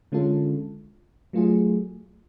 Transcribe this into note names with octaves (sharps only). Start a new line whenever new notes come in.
D3 G#3 C#4 F4 A4
F#3 A3 F4 G#4